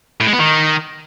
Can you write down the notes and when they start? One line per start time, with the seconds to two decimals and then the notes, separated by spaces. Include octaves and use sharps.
0.20 A2
0.27 G#3
0.33 B3
0.39 D#3